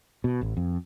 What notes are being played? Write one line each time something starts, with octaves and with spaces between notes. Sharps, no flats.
B2
A1
F2